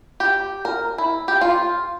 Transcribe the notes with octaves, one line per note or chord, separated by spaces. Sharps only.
G4
A#4
E4
G4
F4